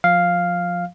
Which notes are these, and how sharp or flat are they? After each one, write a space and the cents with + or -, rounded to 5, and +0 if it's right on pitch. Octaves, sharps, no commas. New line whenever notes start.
F3 +25 F5 +0